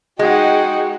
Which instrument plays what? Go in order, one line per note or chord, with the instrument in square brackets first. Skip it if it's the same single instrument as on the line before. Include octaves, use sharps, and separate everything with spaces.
[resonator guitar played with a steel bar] G#3 [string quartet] D#4 G5 [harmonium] F#4 [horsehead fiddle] G#4 F#5